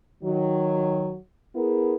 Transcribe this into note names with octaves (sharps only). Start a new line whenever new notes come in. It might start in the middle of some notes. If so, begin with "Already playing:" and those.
D#3 F#3
B3 E4 G#4 A#4